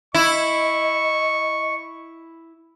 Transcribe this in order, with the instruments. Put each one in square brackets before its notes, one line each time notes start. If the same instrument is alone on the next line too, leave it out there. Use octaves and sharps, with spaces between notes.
[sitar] E4 [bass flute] D#5 [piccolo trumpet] C#6